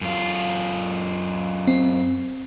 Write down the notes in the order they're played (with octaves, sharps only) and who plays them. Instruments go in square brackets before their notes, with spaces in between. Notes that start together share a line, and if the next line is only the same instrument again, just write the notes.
[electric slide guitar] F#2 F4
[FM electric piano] C4